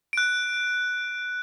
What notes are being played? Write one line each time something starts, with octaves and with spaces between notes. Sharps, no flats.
F#6 D7